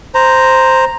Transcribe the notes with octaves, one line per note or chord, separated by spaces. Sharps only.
C5 A#5